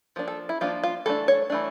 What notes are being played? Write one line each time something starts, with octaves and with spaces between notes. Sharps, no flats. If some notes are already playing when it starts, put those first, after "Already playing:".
F3 A#3 D4
A4
E4
F3 A#3 D4 F4
F4
E3 A3 D4 A4
C#5
E3 A3 D4